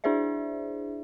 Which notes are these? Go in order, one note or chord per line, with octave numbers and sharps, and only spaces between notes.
D4 E4 G#4 C5 D5 E5